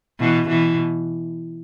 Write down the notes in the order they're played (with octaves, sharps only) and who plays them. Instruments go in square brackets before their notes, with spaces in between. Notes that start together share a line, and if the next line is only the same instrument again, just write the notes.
[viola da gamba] B2 E3
B2 E3